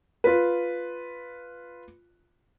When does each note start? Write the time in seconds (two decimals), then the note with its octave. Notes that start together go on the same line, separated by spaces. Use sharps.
0.24 F4 B4